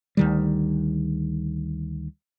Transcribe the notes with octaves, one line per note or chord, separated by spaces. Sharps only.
D2 D#3 G3